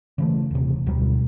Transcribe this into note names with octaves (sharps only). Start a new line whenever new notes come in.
C#3 E3 A3
D#1 C3
D2 B2 F#3 G3